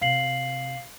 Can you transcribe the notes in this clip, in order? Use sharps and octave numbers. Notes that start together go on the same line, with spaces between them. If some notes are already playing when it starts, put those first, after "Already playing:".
C3 F5 C7 F#7